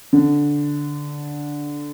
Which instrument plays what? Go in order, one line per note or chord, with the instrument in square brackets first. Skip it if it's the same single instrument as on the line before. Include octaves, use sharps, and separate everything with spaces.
[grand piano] D3